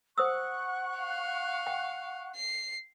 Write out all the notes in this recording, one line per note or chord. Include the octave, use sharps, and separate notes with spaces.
C5 F#5 C#6 D#6 E6 F#6
F5
G5
C7